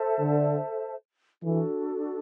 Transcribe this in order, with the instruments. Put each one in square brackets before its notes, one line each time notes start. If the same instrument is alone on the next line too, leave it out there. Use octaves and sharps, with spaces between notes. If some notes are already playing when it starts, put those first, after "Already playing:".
Already playing: [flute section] A4 C5 E5 A5
[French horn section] D3
[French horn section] E3 [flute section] D4 F#4 A4